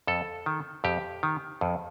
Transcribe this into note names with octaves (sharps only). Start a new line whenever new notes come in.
F2 A4
D#3
F2 G4
D#3
F2